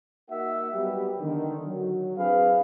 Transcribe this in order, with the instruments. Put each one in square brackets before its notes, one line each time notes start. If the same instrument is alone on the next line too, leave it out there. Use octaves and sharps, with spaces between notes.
[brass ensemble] A#3 D#4 F#4 A#4 E5 F#5
F#3 G3 B3 D#4 G4
D3 D#3
F#3
C4 D4 E4 G#4 B4 F5